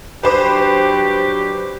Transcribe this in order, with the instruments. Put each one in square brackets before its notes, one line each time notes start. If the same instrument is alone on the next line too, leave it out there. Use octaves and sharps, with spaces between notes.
[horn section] F#3 D4 G4 [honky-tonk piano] B4 C5 D6